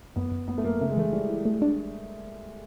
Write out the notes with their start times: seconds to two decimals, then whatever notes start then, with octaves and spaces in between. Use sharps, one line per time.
0.16 F#2 B3
0.31 F#2
0.48 F#2 B3
0.58 A3
0.64 F#2 A#3
0.81 C#3 A3
0.89 G#3
0.97 E3 A3
1.13 E3 G3
1.29 E3
1.45 A3
1.62 D4